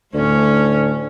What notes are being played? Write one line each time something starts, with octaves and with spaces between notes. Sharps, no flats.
D2 A2 C#4